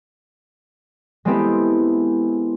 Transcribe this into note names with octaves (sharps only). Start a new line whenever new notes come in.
G#3 A3 B3 C4 E4 G4